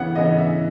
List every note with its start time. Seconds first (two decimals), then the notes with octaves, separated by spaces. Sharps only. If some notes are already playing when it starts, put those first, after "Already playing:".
Already playing: C#3 E3 B3 F#5
0.15 C#3 E3 B3 D#5
0.38 E5